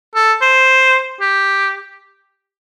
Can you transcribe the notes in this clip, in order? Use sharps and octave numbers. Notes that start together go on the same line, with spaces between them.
A4
C5
G4